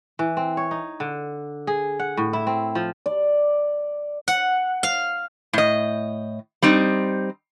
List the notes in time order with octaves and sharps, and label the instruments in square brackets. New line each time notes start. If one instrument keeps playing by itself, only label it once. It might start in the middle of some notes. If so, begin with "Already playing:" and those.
[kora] E3
C4
C#5
D#4
D3
G#4
F#5
A2
E4
C4
F3
[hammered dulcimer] D5
[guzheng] F#5
F5
[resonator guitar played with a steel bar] A2 D#5
G3 C4 D#4